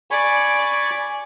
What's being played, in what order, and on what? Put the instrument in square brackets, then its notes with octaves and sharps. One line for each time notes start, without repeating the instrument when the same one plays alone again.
[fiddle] D5 [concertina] G#5 B5 C#6